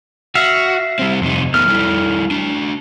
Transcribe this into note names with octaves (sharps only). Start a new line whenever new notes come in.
F#4 E5 F5
G3 C4
F2 C3 D#4
A3 B3 D#4 F6
G3 E4 A4
D4 F#4